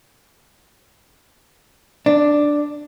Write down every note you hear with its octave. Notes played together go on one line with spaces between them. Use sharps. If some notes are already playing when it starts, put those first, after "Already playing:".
D4